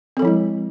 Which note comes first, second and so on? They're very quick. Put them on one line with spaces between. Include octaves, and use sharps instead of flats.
C4 A4 F3 E4 G#3